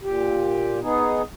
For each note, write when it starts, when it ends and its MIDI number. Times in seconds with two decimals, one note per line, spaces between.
0.03 0.80 46
0.03 0.80 67
0.82 1.22 59
0.82 1.22 63
0.82 1.22 68